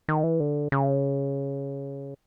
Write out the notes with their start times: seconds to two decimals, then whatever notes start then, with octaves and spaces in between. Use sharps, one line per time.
0.08 D#3
0.23 E3
0.40 D3
0.72 C#3